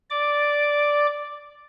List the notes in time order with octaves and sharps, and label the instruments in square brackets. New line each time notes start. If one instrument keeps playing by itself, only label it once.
[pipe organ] D5 D6